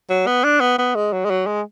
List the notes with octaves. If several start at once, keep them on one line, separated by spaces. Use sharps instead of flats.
F#3
B3
D4
B3
B3
G#3
F#3
G#3
F#3
G#3